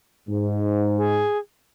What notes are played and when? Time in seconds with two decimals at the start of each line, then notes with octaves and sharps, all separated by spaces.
0.29 G#2
0.96 G#4